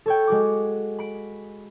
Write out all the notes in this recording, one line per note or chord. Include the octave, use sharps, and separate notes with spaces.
A4 C#5 G5
G#3 F#4 D6
B5 D7